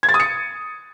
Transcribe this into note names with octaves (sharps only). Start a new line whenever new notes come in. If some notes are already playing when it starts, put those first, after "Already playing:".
G#6
A6
D#6
C#7